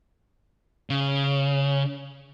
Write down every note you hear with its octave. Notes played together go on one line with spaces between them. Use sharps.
C#3